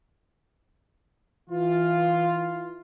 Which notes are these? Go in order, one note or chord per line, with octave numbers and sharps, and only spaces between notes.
E3 F4